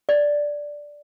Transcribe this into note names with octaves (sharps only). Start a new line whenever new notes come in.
D5